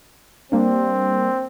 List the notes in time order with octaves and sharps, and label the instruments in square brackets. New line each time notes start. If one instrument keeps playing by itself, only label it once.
[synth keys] G3 A#3 D4 [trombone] C4